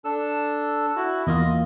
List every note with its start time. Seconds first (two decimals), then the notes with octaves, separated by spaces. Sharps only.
0.05 D4 A4 E6
0.96 E4 F#4
1.27 E2 A#3 F4 D#5